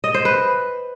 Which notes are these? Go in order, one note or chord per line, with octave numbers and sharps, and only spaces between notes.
D#5
C5
B4